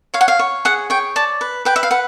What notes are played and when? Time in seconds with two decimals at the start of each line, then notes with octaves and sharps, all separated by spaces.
0.14 C#5 F5
0.21 F#5
0.28 F5
0.39 C#5
0.65 G#4 F#5
0.90 C#5 G5
1.16 D5 A5
1.41 B4
1.65 B4 G5
1.76 E5
1.83 F5
1.91 B4 F#5